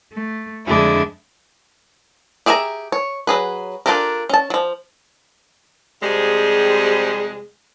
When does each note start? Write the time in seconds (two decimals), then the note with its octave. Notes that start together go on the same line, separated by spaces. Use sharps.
0.13 A3
0.66 F2 D3 G#3 D4 E4
2.46 G4 G#4 E5 G#5 A#5
2.92 C#5
3.27 F#3 G#4 B4
3.86 D4 F4 G4 A4 A#4
4.29 C#4 A5
4.50 F3 F#3
6.03 F2 C3 G3 G#3 G#4